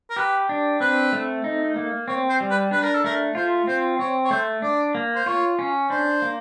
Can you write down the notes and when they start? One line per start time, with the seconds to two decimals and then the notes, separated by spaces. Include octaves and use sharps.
0.10 A#4
0.16 G4 B4
0.49 D4
0.80 C4 B4
1.12 A3
1.44 D#4
1.76 A#3
2.08 C4 C#5
2.29 C5
2.40 G3
2.50 B4
2.71 D4 B4
2.83 A#4
2.94 A4
3.04 A3 A#4
3.35 F4 C5
3.67 C4 C5
3.99 C4 C#5
4.24 C#5
4.31 A3 C5
4.62 D4 D5
4.95 A#3
5.15 C5
5.26 F4 C#5
5.59 C#4
5.90 D4 C5
6.22 A#3